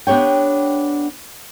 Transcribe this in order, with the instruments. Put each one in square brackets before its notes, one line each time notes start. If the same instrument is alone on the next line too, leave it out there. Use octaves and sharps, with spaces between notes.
[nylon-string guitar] B3 D4 G4 C#5 G5